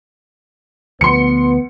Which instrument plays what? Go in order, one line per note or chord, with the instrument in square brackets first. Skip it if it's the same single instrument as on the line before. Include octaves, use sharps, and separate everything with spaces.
[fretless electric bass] D2 F3 [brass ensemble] B3 [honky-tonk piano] C6 C#7